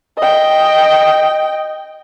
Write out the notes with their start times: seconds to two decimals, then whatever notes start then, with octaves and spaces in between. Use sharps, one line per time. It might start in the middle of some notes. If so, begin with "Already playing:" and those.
0.18 D#5 G5